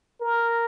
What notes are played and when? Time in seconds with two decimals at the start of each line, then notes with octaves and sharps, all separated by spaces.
0.21 A#4